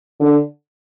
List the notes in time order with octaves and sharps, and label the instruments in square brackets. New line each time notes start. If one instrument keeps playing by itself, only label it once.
[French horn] D3